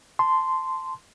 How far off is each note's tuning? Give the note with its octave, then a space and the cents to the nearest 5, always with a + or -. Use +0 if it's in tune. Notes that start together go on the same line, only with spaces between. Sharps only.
A5 +0 C6 -10